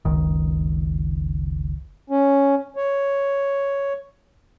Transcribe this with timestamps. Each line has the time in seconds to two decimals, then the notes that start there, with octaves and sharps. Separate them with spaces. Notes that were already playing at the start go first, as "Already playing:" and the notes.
0.05 F#1 C#2 D#3
2.10 C#4
2.76 C#5